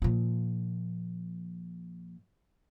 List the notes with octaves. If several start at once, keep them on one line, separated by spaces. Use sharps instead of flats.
A#2 F3